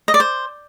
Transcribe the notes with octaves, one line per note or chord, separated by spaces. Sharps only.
D#5
D5
C5